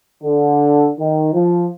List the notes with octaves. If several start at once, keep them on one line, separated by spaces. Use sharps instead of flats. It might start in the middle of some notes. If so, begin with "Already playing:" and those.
D3
D#3
F3